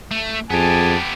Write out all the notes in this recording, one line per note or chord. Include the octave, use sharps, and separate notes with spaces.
A3
F2 B3 G4 G#4 G#5 A5